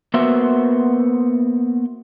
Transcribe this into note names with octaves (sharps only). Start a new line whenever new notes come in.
A#3 B3 F#4 C5 E5